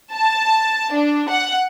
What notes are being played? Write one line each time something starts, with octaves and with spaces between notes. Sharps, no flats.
A5
D4
F#5